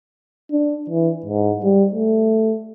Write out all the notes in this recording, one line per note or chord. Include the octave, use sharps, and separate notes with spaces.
D4
E3
G#2
G3
A3